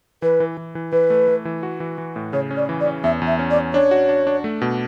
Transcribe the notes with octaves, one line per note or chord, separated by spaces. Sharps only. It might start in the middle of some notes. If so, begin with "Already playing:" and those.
E3 B4
E3
E3
E3
E3 B4
A3
A3
E3
F#4
E3
E3
A2
C#3 C#5
C#4
D5
E3
D5
C#4
E2 E5
E2
E5
C#4
D5
C#4
D4 C#5
F#4
D4
D4
A3
B2